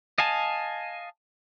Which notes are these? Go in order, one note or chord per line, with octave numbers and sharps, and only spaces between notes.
D#5 F5 G#5 A5